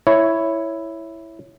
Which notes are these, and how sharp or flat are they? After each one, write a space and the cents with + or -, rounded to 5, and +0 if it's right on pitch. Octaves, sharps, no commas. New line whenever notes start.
E4 +0 C#5 +0